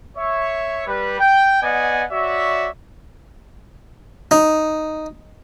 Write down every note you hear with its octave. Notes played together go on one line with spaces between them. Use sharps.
C#5 E5
G3 B4
G5
B3 D5 D#5 F#5 G#5
F#4 C#5 D5 E5
D#4